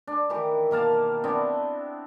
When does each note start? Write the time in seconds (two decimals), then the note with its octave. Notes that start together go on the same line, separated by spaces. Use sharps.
0.07 D4
0.30 D#3 E3 G4
0.71 B2 A#3 F5 A5
1.24 B3 C4 D4 E4